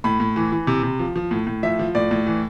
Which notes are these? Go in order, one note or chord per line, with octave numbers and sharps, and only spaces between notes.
A2 B5
A2
E3
E3
C3
C3
F3
F3
A2
A2
F3 E5
F3
A2 D5
A2
E3